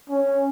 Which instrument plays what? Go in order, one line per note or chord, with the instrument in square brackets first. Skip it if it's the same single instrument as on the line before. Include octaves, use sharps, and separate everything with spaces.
[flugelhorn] C#4